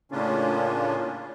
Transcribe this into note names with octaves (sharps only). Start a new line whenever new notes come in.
A2 C#3 A#3 C#4 D4 F4